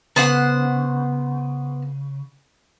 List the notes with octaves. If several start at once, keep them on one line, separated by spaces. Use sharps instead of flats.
C#3 B3 C5 F#5